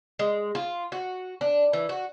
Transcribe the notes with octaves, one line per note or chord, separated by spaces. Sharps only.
G#3
F4
F#4
D4
E3
F#4